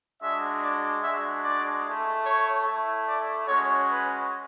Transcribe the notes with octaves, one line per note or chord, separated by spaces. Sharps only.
G#3 D4 F#4 E5
D5
G#3 D4 F#4 E5
D5
A3 E4
C#5
A3 E4
D5
G#3 C#4 F#4 C#5
B4